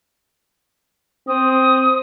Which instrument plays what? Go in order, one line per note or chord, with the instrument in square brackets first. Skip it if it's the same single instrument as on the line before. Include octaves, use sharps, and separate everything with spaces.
[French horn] C4 [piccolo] D#6